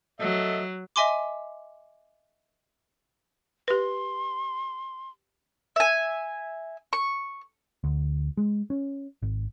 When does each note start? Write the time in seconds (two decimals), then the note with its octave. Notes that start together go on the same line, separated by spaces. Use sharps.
0.20 F#3 A4 D#5 E5
0.96 D#5 E5 G#5 C6 D6
3.68 G4 B4 C6
5.76 E5 G#5
6.93 C#6
7.84 D2
8.37 G#3
8.70 C#4
9.22 G#1